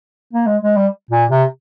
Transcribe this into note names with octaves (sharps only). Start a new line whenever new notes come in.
A#3
G#3
G#3
G3
A#2
C3